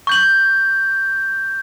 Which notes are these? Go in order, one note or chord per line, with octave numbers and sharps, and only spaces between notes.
C#6 G6 F#7